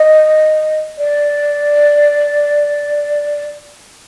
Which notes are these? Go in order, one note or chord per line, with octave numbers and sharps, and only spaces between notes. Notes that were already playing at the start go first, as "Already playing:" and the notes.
Already playing: D#5
D5